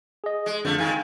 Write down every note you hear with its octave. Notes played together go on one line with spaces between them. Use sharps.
G#4 D#5
G#3
F2 D3 F3 A3
D#3 G#3 F5 G#5